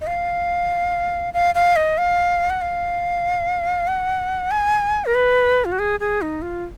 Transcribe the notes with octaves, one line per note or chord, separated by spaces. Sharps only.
D#5
F5
F5
F5
D#5
F5
F#5
F5
F#5
G#5
A#4
B4
F4
F#4
G#4
G#4
D#4
F4